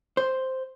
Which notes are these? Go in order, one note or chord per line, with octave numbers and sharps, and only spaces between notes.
C5